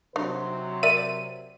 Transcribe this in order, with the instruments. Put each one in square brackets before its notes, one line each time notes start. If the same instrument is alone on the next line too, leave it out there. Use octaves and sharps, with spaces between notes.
[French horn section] C3 F#3 C5 [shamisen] D4 D#4
[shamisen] A#4 D5 E5 [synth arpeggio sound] D#7